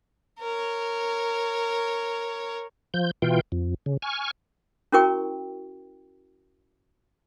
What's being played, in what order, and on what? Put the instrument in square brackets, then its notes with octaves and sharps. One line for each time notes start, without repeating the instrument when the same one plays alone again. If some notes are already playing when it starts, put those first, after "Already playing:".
[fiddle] A#4 C#5
[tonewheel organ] F3 G6
B2 E3 F4 G5
F2
C#3
G#5 C#6 F6
[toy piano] C#4 E4 F#4 A#4 G5 C#6